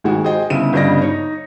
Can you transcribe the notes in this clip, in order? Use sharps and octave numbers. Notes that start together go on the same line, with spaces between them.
G#1 G#3 F#4
G#4 C5 D#5 G5
G1 C#3 E4 D#7
G1 G2 C#3 D5 D#5 A#6
D#4 C#5